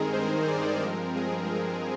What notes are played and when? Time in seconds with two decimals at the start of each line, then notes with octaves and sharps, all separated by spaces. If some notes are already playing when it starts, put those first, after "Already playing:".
Already playing: G2 D#3 G#3 C4 D#4 G#4 A#4
0.13 C5
0.48 D5
0.82 G2 F3 G#3 C4 A#4
1.16 G#4
1.51 A#4